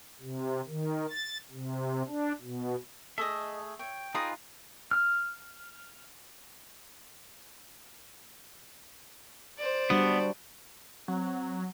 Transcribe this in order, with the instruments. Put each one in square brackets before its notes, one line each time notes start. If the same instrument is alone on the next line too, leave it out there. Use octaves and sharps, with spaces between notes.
[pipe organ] C3
D#3
A6
C3
D4
B2
[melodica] A3 G#4 [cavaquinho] A4 D#5 [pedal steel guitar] E5
[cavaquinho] C#5 [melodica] G5
[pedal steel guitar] D#4 F4 B4 [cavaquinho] G#4 A#5 D#6
[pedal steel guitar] F6
[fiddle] C5 D5
[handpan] G3 D4 F#4 [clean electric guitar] B3
[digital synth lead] F#3 [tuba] C4